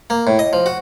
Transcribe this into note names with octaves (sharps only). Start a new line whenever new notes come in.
A#3
A2
D#5
F3
F#4